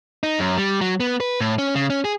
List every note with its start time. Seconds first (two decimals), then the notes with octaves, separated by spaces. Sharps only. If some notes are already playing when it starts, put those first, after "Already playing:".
0.23 D#4
0.39 F#2
0.57 G3
0.81 F#3
1.00 B3
1.20 B4
1.40 A2
1.58 C#4
1.75 C#3
1.90 C#4
2.05 G#4